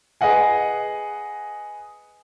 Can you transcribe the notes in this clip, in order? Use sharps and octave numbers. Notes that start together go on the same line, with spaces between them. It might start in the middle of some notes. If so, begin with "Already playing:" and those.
G#4 B4 D#5 F#5 G#5